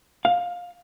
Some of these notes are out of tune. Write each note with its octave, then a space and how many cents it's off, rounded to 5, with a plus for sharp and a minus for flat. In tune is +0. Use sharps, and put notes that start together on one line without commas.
F5 +15